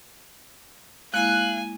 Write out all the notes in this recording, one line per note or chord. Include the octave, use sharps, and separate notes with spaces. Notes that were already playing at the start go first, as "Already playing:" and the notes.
G#3 A#3 E4 F5 G#5 F#6